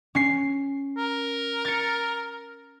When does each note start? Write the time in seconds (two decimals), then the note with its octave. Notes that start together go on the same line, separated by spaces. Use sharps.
0.15 C#4 C7
0.97 A#4
1.65 A6 C#7